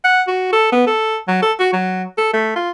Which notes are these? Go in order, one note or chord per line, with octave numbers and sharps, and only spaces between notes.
F#5
F#4
A4
B3
A4
F#3
A4
F#4
F#3
A4
A3
F4